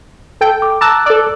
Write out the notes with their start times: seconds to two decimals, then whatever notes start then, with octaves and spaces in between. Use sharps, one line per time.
0.41 A4 G5
0.62 D6
0.81 A5 A#5 D6 E6 F#6
1.06 A4 D5